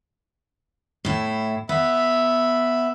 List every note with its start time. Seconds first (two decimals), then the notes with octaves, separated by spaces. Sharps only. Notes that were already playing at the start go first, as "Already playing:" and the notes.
1.05 A2 E4
1.69 B3 E5 B5